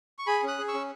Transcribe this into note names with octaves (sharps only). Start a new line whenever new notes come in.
C#6
G#4 G#5 B5
C#4 D#6 F#6
G#4
C#6 E6
C#4